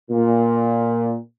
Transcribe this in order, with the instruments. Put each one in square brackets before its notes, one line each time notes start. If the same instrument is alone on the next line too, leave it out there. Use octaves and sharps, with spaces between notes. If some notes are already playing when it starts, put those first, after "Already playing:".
[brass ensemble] A#2